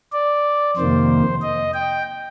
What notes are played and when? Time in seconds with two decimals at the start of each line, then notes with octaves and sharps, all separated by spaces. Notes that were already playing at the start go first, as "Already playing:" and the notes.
0.12 D5
0.77 F2 C3 D#3 A#3 C5
1.42 D#5
1.74 G5